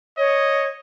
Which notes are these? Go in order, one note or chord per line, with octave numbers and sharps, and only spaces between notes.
C#5 D#5